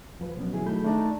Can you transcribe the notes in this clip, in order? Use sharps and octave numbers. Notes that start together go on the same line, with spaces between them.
E2 F3 B4
B2 F#3 B3 C#4
D3 E3 F#3 E4 G#4
D#3 F#3 A3 A4 B5 G6
A3 D4 D#4 D5 A5 A#5